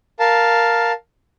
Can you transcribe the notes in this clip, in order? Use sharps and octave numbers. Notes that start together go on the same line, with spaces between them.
A#4 F5 A5